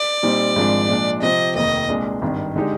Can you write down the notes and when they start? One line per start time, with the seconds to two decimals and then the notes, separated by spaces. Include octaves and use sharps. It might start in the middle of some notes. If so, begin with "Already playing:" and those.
Already playing: D5
0.23 A#2 G3 C4 D#4
0.56 G#1 G#2 F3 G#3 D4
0.89 A#2 F3 G#3 D4
1.22 C3 F3 C4 D#5
1.55 F1 D#2 D#3 D#5
1.88 C2 A#2 G#3 D4
2.22 G#1 G2 D#3
2.56 D3 G#3 D#4 G4